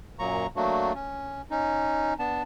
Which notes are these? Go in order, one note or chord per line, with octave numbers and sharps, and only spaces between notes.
F#2 A#2 F#3 A#3 A#5 C#6
F#3 A3 A#3 D4 F#4
C#4
C#4 D#4
B3 D4 A5